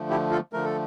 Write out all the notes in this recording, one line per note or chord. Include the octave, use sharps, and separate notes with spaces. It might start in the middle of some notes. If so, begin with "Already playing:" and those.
Already playing: D3 F3 A3
E4 G4
F4 A4
D3 F3 A3 A#4
A4